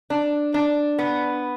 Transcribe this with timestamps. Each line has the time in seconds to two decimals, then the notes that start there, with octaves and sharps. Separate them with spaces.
0.10 D4
0.54 D4
0.98 B3